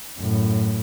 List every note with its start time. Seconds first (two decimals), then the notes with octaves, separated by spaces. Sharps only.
0.18 F#2 A2